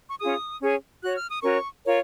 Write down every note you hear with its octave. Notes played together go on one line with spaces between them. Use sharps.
C#6
C#4 F4 G#4 D#6
C#4 G#4 C#5
F#4 C#5 F#6
F6
D#6
C#4 F#4 A#4 C#5 C#6
F4 A#4 C#5